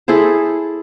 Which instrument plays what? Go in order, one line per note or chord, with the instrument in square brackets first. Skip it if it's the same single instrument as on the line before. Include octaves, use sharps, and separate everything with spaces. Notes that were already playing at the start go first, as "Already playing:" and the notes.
[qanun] E4 G#4 A4 C5